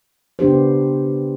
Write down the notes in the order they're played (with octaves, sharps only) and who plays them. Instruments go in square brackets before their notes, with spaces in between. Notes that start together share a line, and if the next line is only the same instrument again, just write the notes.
[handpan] C#3 B3 D4 G4 C5